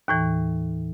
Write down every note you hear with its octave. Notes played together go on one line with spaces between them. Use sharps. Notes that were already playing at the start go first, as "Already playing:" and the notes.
D#2 A2 E3